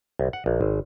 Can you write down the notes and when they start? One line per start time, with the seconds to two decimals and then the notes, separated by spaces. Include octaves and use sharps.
0.19 C2
0.33 F#5
0.46 A#1
0.61 G#1